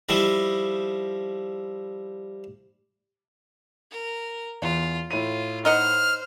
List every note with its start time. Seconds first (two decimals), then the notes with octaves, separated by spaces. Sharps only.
0.09 F3 G3 E4 D#5
3.91 A#4
4.62 E2 F4
5.11 A2 F4 D#7
5.65 D#4 C5 D#5 F#5 F6